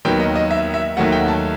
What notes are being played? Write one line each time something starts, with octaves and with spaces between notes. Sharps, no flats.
D#2 D#3 F#3 B3 G5
D#5
D#5
E5
E5
D#2 D#3 F#3 A3 F#5
G5
A5